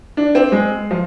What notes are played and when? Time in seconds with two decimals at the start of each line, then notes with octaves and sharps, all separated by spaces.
0.17 D4
0.35 C4
0.52 G#3
0.91 F3